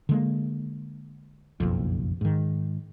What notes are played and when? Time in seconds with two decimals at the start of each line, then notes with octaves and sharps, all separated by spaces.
0.09 D3 G#3 A#3
1.60 F#1 B1 F2
2.21 G#2 D#3